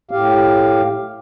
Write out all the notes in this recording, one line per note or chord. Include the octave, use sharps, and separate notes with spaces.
A2 G4 F5